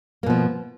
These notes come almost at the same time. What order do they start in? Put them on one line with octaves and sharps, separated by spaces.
A#3 B2 F3